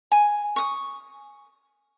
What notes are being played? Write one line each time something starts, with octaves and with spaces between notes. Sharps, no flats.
G#5
C#6 D#6